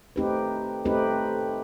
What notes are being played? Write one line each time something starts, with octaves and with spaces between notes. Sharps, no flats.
A3 C4 D#4 G4 B4
A3 C4 D#4 G4 B4